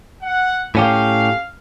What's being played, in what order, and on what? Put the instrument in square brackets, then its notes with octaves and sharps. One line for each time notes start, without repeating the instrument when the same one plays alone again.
[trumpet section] F#5
[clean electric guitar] A2 C#4 G4 [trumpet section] F5